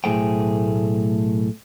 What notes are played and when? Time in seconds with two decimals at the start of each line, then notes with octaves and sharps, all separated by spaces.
0.04 B1 A2 A3 G#4 C5 G5